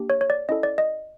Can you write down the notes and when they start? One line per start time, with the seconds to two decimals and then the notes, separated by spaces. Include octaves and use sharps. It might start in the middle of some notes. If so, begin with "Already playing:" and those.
Already playing: A#3 D4 G4
0.10 C#5
0.21 C#5
0.30 D5
0.49 C#4 E4 A4 D#5
0.63 D5
0.78 D#5